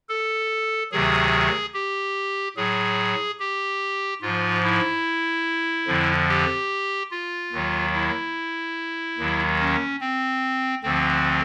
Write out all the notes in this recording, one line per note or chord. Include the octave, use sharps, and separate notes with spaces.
A4
D2 C3 D#3 F#3 G#4
G4
A2 F#3 G#4
G4
G#2 F3 F4
E4
F2 D3 F3
G4
F4
D#2 D#3 F#3
E4
D#2 D#3 F#3
C#4
C4
D2 D3 F3 C4